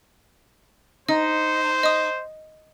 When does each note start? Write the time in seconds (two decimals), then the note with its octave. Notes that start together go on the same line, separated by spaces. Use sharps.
1.09 D#4 C5 D#5
1.83 D#5 D#6